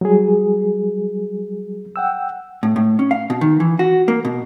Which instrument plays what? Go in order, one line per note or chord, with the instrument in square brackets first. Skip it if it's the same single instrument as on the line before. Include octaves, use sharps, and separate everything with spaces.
[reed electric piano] F#3 G3 G#4
F#5 G5 E6
[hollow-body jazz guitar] A2
A2
C#4
F5
B2
D#3
E3
F#4
A#3
B2